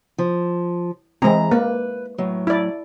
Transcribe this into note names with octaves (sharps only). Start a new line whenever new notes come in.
F3
E3 G#3 C4 A#5
A#3 B4
A2 F#3
E4 D5